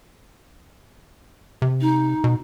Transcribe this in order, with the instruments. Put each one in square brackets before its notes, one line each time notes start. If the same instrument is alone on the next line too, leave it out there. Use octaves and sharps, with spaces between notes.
[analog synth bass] C3
[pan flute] D#4
[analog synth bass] B2